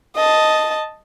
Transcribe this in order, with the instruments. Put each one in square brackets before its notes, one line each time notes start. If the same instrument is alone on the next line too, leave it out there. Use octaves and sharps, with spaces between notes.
[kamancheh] D#5 A5